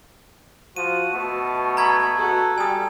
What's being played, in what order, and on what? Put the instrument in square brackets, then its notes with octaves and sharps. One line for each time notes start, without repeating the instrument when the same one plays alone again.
[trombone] F3 [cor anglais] F#4 [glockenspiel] D#7
[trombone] B2 [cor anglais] A3
[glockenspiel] A#5 G#6 [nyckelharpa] B5
[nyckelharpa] F#4 A4
[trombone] G3 [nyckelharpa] A4 [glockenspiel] G#5 D#6